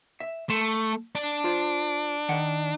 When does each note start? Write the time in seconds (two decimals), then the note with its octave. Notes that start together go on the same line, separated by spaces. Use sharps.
0.20 E5
0.50 A3 A5 C6
1.15 D4
1.44 F4 C5
2.29 D#3 F#5